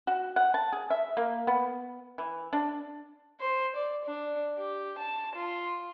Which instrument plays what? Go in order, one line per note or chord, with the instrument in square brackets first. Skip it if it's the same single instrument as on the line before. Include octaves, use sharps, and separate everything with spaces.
[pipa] F#4
F#5
A5
G#4
E5
A#3
B3
E3
D4
[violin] C5
D5
D4
G4
A5
F4